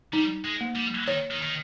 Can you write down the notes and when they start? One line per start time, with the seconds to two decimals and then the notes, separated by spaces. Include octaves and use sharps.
0.13 G3 D#4
0.45 G#3
0.61 A#3
0.76 G3
1.07 D#3 C#5
1.31 D#3
1.42 D#3